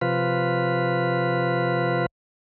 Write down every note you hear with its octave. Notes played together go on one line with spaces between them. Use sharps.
C3 F3 F4 B4